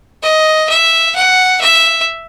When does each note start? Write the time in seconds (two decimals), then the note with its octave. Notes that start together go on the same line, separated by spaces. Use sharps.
0.23 D#5
0.69 E5
1.15 F#5
1.61 E5